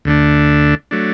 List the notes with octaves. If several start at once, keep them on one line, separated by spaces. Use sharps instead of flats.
D2 D3 A3 D4
F#3 A3 D4